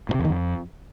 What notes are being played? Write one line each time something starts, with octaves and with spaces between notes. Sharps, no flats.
A2
C3
E2
D#3
F2